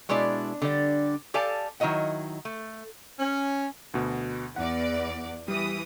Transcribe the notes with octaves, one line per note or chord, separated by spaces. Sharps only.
B2 G#3 D4 E4 D5
D3 G3 D5
G4 A4 D5 F5 G#5 A5
D#3 F#3 E4 D#5 F#5
A3
C#4
D2 B2
E2 D5 F#5
E3 G3 D#6